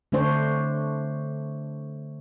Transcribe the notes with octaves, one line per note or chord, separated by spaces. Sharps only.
D3 A3 D4 C5 C#5